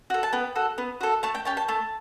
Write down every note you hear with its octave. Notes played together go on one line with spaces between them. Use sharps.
F#4 A4
A5
B3 G5
F#4 A4
B3
F#4 A4
A3 A5
G5
C#4 G4 A5
A5
A3 A5